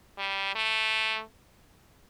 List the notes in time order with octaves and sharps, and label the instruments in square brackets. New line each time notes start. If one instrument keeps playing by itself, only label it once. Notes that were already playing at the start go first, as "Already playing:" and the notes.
[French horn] G3
A3